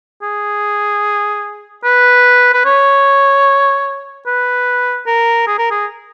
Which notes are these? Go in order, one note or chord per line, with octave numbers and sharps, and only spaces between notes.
G#4
B4
B4
C#5
B4
A#4
G#4
A#4
G#4